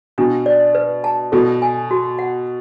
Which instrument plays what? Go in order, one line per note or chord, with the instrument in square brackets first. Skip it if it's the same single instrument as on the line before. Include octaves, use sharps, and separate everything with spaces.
[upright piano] B2 [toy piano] D4
[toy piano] D5
B4
A5
[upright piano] B2 [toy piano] A4
[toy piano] G#5
F#4
F#5